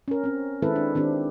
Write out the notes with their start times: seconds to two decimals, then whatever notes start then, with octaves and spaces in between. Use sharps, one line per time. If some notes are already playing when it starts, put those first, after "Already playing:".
0.08 C#4 A#4
0.24 C4 C#4
0.62 D#3 G#3 C4 E4 A4 B4
0.76 D4
0.95 D#3 C4 D4 G4